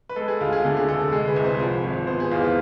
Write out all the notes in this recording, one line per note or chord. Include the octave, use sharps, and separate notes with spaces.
B4
G#3 A4
G#4
D2 F4
G#4
D3 A4
G#4
F1 A4
G#3 G#4
B4
C2
C5
F3
G#1
B3 C5
G#4
E2 F4
F4